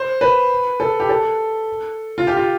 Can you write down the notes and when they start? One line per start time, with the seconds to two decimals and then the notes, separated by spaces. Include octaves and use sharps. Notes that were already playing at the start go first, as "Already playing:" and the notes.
Already playing: C5
0.21 B4
0.80 A4
1.00 G4
1.09 A4
2.18 F4
2.27 G4
2.37 F4